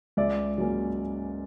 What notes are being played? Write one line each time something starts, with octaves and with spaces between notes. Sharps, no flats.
C#2 D5 E5
C#3 F#3 A#3 C#4